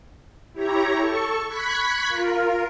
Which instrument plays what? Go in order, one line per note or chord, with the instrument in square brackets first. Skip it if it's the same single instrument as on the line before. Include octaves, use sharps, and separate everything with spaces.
[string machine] E4 G4 C#5 A#5
A4 C#6
B5 C#6 F#6 G#6 B6
F4 A#4